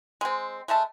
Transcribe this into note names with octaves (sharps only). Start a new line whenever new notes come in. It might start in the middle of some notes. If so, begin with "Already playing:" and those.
G#3 C4
G#3 A3 E5 A5